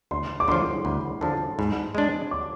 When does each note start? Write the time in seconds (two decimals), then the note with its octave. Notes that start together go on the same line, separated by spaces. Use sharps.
0.11 D2 C6
0.40 D6
0.48 D3 F3 C6
0.85 D2 B5
1.21 D3 F3 A5
1.58 G#2 B5
1.94 G#3 D4 C6
2.31 D6